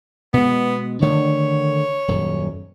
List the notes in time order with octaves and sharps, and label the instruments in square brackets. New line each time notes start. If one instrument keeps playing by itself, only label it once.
[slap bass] B2 G#3 [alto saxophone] B3
[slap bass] D3 D#3 A3 [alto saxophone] C#5
[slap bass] D#1 F#2